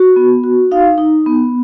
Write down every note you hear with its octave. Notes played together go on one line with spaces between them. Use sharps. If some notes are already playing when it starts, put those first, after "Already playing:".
Already playing: F#4
B3
F#4
D#4 F5
D#4
B3